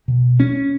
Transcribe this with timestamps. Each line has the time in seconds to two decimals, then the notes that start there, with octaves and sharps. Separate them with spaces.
0.08 B2
0.40 C#4